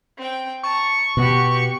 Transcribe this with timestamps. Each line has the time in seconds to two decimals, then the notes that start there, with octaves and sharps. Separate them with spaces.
0.18 C4 G5
0.63 A5 A#5 C#6
1.17 B2 B3 F#4 G4